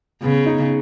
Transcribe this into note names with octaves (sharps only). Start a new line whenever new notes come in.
C#3 B3
D#4